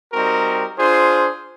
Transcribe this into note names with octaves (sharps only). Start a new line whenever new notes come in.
G3 C4 D#4 F#4 A#4
D4 F4 G#4 C5